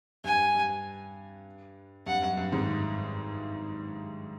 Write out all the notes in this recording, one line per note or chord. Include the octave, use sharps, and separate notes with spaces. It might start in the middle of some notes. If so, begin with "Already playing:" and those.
G2 G#5
G2
G2 F#5
F#2
G2
G#1 G#2